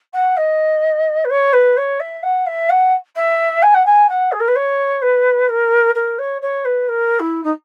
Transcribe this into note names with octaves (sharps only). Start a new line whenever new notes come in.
F#5
D#5
B4
C#5
B4
C#5
E5
F#5
E5
F#5
E5
G#5
F#5
G#5
F#5
G#4
A#4
B4
C#5
B4
A#4
A#4
C#5
C#5
B4
A#4
E4
D#4